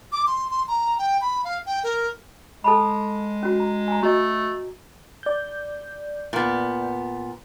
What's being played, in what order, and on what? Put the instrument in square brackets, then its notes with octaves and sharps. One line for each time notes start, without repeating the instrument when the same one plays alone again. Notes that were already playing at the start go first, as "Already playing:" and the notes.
[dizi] D6
C6
C6
A#5
G5
B5
F5
G5
A#4
[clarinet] G#3 [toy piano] A4 A5 B5
[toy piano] C#4 F#4
A#5
G#5 A#5
[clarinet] A3 [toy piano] F#4 D#5
[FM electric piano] D5 G6
[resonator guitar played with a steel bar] A#2 B3